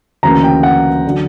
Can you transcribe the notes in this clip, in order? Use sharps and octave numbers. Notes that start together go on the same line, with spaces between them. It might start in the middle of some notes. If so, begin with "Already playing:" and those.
D2 C#3 E3 A#3 C#4 A#5
G5
F#5
D3 F#3